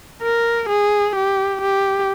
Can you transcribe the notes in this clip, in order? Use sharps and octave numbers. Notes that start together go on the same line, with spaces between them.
A#4
G#4
G4
G4